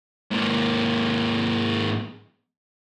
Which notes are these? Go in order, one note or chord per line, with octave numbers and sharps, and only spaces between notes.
G#2 A#3